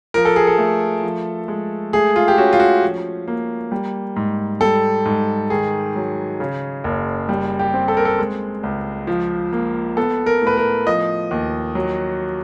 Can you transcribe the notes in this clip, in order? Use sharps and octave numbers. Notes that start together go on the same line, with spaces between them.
F3 A#4
A4
G#4
A4
A3
F3
G#3
A3 G#4
F4
G4
C#4 F#4
F4
F#4
F3
A#3
G3
G#2
G3 A4
G#2
D#3 G#4
F#3
C#3
F#1
G3
G4
C4
A4
A#4
A4
G#3
C#2
F3
A#3
B3 A4
A#4
A2 B4
A#4
F3 D#5
D#2
F#3